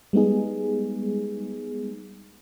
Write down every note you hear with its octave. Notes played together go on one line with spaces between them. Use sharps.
G3 G#3 B3 D#4 G#4